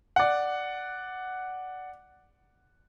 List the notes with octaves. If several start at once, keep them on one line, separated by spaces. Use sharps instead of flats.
D5 F#5